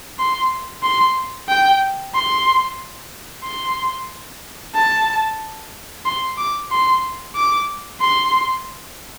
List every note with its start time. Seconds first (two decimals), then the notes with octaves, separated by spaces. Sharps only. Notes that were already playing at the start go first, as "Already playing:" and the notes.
0.19 C6
0.83 C6
1.49 G5
2.14 C6
3.44 C6
4.75 A5
6.05 C6
6.38 D6
6.71 C6
7.35 D6
8.01 C6